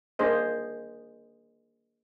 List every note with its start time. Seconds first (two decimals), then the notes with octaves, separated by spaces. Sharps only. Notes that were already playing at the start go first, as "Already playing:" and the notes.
0.19 A#3 D4 G#4 C5 D#5